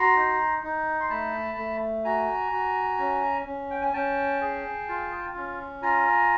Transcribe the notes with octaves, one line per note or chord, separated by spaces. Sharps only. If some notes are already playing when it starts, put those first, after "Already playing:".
Already playing: F#4 A#5 C6
D#4
D#4
C6
A3 A5 B5
A3
F#4 G#5 A#5
F#4
C#4
C#4
G5
G#5
C#4 G5 A5
G#4
F4
C#4
F4 G#5 A#5